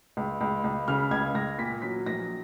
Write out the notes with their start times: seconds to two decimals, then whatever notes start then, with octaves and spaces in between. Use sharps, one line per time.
0.17 C#2
0.41 C#2
0.64 C#2
0.88 C#3 F6
1.11 C#2 G#6
1.35 C#2 A#6
1.58 A#2 B6
1.82 F#3 B6
2.06 A#1 A#6